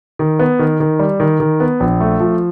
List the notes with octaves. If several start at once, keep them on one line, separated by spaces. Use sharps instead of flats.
D#3
B3
D#3
D#3
G3
D#3
D#3
B3
A#1
A3
F3